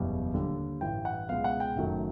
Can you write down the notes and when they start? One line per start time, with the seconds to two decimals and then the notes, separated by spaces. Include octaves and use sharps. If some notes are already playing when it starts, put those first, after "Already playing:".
Already playing: F#1 E2 B2 G3
0.34 D#2 D3 G3
0.81 A1 G2 E3 G5
1.05 F#5
1.29 C#2 B2 G#3 F5
1.44 F#5
1.60 G5
1.76 F#1 F#2 D#3 F#3 A3